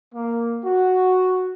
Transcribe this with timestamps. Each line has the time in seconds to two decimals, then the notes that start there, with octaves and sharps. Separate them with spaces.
0.15 A#3
0.65 F#4